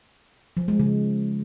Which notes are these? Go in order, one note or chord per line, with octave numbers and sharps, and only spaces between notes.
F3
G#3
C#3